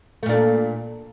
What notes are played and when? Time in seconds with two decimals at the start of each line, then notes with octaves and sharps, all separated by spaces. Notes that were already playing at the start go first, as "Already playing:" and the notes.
0.23 A3
0.26 A#2
0.29 D4